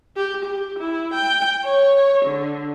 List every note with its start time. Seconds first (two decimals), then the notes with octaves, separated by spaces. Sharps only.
0.16 G4
0.45 G4
0.79 E4
1.14 G5
1.65 C#5
2.26 D3